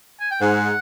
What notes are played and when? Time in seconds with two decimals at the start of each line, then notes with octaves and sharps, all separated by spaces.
0.20 G#5
0.31 G5
0.41 G#2 F#5